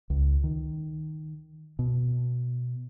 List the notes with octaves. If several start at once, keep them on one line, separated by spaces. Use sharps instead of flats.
C#2
D#3
B2